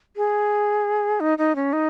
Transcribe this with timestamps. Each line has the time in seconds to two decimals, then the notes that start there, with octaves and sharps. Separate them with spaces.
0.17 G#4
1.20 D#4
1.38 D#4
1.56 C#4
1.73 D#4